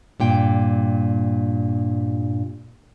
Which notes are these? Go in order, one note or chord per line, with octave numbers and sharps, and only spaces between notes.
G2 A#2 G5